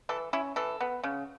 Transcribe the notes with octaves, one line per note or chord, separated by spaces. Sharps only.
E3 A4
C#4 E4
E3 A4
B3
C#3